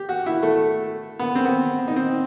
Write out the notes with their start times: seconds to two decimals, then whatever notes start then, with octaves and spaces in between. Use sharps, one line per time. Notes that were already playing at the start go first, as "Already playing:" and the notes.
Already playing: G4
0.09 F#4
0.26 E4
0.43 A3
1.19 B3
1.35 C4
1.45 B3
1.88 D#4
1.96 C4